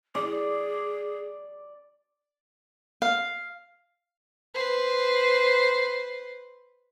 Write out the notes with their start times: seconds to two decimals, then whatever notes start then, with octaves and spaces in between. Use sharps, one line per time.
0.15 G#4 D5
3.02 F5
4.54 B4 C5